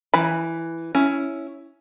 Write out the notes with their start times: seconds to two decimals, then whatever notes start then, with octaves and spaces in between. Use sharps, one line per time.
0.14 E3 B5
0.95 C#4 E4